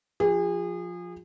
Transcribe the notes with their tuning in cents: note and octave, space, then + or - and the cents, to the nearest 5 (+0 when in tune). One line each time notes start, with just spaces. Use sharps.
F3 +15 G#4 -35